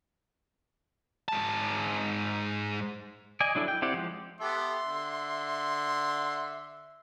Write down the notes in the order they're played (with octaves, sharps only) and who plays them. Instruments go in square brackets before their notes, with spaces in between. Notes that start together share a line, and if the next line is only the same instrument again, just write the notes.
[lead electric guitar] G#2 A5
[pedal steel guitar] D5 D#5 G#5
F#3 D4 E4 A4
G5
C4 E4 G4 D5 F#5
F3 G#3
[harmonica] B3 G4 A4 [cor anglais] E5 [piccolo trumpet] C6
[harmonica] D3